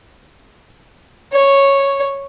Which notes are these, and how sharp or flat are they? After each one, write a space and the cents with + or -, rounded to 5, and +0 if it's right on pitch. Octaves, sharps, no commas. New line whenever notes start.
C#5 -5